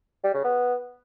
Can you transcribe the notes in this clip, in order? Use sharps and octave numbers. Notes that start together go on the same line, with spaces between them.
G3
C#3
B3